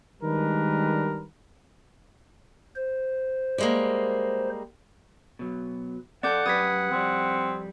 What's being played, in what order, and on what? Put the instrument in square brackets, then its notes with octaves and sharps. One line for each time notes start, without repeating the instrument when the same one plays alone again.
[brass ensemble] D#3 G3 G#3 D4 A#4 B4
[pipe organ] C5
[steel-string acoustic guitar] G3 G#3 A#3
[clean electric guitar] B2 F#3
[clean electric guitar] C4 A4 A5 [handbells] D5 D6 G6 [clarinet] F#5
[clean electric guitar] F#2 G4 B4 [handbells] D#6 G#6 B6
[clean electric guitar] F2 G3 [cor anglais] C4